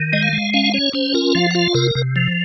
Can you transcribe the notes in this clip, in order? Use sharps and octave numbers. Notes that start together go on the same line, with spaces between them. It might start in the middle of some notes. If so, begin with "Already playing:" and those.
Already playing: D#3
G#3 D#5
F5
G#3
C#4 F5
C#4 C#5
C#4 C5
F4 A#4
F3 F5
F#5
F4 F5
C3 A#4
C3
F3